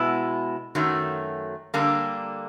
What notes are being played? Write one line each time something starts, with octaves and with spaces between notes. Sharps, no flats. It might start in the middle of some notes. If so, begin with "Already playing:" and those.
Already playing: B2 G#3 B3 E4
F#2 D#3 F#3 A3
D3 G3 A#3 D4